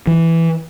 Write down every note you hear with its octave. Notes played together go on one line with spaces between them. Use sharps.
E3